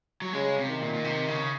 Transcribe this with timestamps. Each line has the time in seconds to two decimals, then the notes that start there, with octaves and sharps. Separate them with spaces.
0.22 F#3
0.33 C#3 G#3
0.58 C3
0.69 D#3
0.81 A#2
0.94 A#2
1.05 C3
1.28 C#3